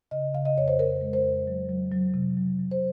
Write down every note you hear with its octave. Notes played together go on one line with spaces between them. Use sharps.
C#3 D#5
C#3 F5
D#5
F2 C#5
C5
F2 A#4
G#3
C5
F2
F#3
F#3
F#3
C3
F#3
F#3
C5